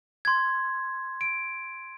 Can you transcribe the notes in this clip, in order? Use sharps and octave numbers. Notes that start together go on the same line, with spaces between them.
C6 G#6
D7